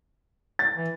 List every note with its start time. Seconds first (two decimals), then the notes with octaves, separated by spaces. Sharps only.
0.59 A6
0.77 E3